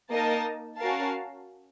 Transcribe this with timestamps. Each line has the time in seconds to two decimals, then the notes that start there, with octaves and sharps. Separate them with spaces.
0.12 A#3 D#4 A#4 D#5 A5
0.79 C#4 F#4 A#4 F5 A5